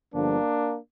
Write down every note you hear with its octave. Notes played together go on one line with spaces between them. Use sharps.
G1 G2 D3 F3 A#3 D4